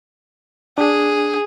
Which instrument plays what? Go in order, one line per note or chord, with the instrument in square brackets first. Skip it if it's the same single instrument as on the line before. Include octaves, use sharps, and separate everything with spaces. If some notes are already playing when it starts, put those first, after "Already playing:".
[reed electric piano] D4 [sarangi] G#4